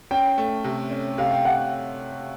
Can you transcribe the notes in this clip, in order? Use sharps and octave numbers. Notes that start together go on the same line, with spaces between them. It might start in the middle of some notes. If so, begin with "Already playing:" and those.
C#4 G5
A3
C3
C#4
C3 F5
G5
C3 F#5